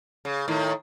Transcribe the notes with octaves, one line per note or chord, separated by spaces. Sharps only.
C#3
A2 D#3